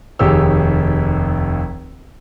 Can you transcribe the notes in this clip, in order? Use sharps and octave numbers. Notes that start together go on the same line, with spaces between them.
F1 D#2 G4 G#4 C#5 E6